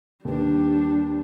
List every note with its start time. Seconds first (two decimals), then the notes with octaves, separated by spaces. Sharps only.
0.25 D#2 G3 D4 G4 B4